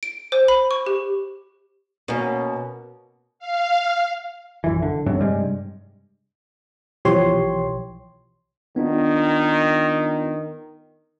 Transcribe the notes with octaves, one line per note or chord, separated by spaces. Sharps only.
D7
C5
B5
C#6
G4
B2 A#3 B3 C#4 F#4
F5
A#1 F#2 E3
D3
A1 G#2 C3 F#3
G2 C3 G3 G#3
B1 E3 F3 G4 C#5 C6
D#3 B3 D4 F4